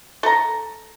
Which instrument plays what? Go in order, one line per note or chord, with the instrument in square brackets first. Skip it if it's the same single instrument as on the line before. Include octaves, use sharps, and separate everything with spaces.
[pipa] A4 A#5